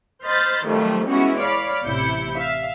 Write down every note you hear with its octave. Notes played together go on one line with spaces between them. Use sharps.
C5 D#5 B5 F6 A6
F2 D#3 F#3 G3 A3
E3 G#3 B3 C#4 E4 F#4
C#5 D5 F5 B5
A1 C3 E4 G6 C#7
E5 F5